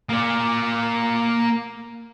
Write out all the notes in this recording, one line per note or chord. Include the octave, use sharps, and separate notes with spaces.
A#3 D5